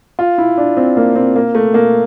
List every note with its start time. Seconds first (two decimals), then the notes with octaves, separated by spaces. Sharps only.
0.19 F4
0.38 E4
0.58 D4
0.77 C4
0.97 A#3
1.15 C4
1.36 A#3
1.55 A3
1.74 A#3